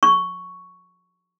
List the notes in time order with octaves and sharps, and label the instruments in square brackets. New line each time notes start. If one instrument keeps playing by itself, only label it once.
[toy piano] C#6